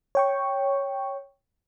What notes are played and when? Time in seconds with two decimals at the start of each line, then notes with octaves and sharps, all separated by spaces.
0.15 C#5 G5 C#6